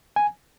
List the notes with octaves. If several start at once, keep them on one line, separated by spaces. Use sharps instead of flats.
G#5